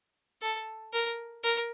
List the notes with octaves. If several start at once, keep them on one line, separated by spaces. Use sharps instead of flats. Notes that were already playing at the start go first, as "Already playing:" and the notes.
A4
A#4
A#4